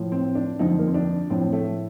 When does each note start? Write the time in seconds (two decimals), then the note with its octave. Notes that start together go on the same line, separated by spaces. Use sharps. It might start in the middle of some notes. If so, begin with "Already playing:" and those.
Already playing: A2 F3
0.12 C4
0.35 D4
0.59 F2 D3 F3 D#4
0.79 A#3
0.87 C4
0.94 D4
1.30 A2 F3 C4
1.53 A3